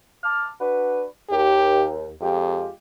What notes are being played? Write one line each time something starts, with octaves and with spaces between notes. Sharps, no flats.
A5 D6 F6
D4 F#4 B4
D#2 G4
F2 G#3 F4 G4